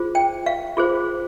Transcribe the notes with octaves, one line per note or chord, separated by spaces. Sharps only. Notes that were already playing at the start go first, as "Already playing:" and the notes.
Already playing: F4 G#4 C5
G5
F5
F4 G#4 C5